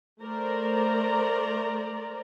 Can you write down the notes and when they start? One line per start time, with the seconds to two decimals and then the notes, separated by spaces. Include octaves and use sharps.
0.22 A3 A#4 C5 D5 A#5